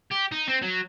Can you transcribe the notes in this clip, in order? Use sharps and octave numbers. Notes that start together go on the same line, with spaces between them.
G4
D#4
C4
F#3